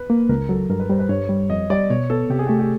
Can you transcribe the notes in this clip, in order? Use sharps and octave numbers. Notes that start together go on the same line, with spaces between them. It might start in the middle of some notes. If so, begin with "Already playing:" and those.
Already playing: B4
A#3
C#2 A#4
F#3 A4
G2 A#4
B4
G3 C5
B4
G2 C#5
G3
F2 D#5
G3 D5
B2 C#5
B3 A4
C3 G4
G#4
A3 G4
G4